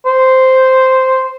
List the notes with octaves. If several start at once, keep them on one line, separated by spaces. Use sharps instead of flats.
C5